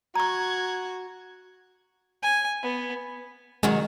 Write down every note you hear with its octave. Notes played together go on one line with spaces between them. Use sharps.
F#4 A#5 C#6 G#6
G#5
B3
D#3 F#3 G#3